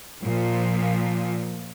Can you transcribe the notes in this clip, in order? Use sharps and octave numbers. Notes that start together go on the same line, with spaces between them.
A#2 F3